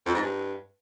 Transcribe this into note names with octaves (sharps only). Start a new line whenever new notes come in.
F2
G#2
G2